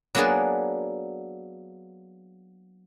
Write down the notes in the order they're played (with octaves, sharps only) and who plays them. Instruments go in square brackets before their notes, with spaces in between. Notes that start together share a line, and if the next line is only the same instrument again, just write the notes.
[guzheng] F#3 A#3 B3 D4 G#4 D5